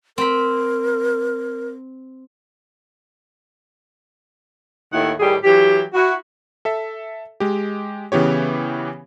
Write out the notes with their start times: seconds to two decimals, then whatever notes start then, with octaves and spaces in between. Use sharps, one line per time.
0.18 C4 A#4 B5
4.93 D#2 A2 D#3 E4 F#5
5.20 A2 D#3 G3 G4 G#4
5.44 E3 F#3 G4
5.94 E4 F#4
6.65 A4 E5
7.40 G#3 G4
8.12 C#3 E3 B3 G4 C#5